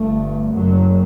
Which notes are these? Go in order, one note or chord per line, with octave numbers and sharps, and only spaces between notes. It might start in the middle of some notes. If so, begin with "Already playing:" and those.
Already playing: G1 G2 A3
F#1 F#2 F#3